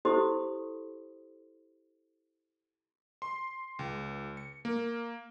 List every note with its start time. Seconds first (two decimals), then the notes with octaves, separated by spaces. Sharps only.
0.05 E4 G4 A4 C5 C6 D#6
3.22 C6
3.79 C#2
4.37 C#7
4.65 A#3